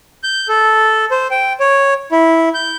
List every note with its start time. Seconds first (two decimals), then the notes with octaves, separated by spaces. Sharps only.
0.23 G6
0.48 A4
1.11 C5
1.31 G5
1.60 C#5
2.12 E4
2.54 G6